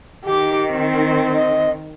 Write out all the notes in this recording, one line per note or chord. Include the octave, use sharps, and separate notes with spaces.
D#3 G4 D6
C4
D#5